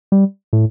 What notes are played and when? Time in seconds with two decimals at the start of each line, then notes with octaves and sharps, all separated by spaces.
0.12 G3
0.53 A2